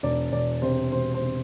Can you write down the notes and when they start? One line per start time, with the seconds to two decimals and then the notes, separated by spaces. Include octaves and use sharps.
0.03 E1 D5
0.32 E1 D5
0.62 C3 C5
0.92 E1 C5
1.14 C5
1.21 C3